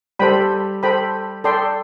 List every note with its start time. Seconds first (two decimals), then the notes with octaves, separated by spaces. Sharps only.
0.19 G3 A4 C5 G5 B5
0.83 A4 C5 G5 B5
1.44 A4 D5 G5 C6